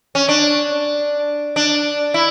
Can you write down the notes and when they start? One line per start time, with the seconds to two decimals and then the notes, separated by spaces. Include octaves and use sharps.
0.15 C#4
0.29 D4
1.56 D4
2.14 E4